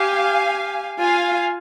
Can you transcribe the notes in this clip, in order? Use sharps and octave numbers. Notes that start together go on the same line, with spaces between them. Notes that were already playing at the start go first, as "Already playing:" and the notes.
Already playing: G4 F5 G#5
F4 F5 G#5